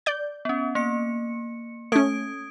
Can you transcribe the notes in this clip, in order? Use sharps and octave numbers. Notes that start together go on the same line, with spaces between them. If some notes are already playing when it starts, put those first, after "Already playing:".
D5 G6
B3 C#4
A#3 C#7
A3 C#4 D#6 G#6 D7